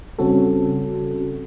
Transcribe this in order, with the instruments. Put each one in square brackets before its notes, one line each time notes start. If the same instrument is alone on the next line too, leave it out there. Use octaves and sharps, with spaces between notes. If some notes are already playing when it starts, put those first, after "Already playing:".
[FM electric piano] C#3 G3 C4 C#4 F#4 A4